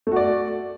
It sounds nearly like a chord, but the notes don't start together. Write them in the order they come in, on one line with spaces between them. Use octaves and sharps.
A3 F#4 D5